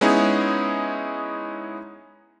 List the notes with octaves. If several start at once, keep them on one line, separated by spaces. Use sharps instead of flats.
G#3 B3 C#4 D#4 E4 G#4